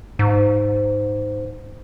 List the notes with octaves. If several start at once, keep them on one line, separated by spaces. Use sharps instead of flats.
G#2